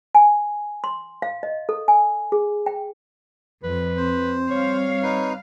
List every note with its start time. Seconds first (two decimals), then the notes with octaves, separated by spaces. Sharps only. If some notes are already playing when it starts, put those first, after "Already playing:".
0.15 G#5
0.84 C6
1.22 F5
1.43 D#5
1.69 A4
1.88 G#5
2.32 G#4
2.66 G5
3.63 F2 B4
3.97 C4 C5
4.51 G3 C#5 F5
5.03 D#4 B4